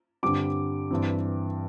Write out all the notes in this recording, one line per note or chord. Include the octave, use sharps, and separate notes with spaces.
G2 D3 G3 C4 D6
G2 E3 C4